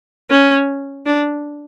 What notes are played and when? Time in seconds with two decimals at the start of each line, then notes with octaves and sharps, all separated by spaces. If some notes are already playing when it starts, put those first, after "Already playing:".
0.30 C#4
1.06 D4